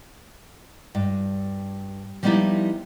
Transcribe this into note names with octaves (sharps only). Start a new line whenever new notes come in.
G2
F3 G3 B3 D#4 E4 G4